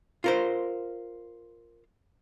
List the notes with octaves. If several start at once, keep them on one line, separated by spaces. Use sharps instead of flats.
F4 A#4 C5